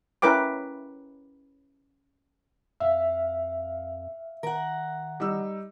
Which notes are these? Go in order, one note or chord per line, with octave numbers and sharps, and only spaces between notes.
C#4 E4 A#4 B4 G5 D6
F2 E5 F5
D#3 A#4 F#5
G3 D#4 E6